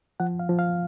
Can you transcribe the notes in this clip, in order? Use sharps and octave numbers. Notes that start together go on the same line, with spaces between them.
F3 F#5
F5
F3
F5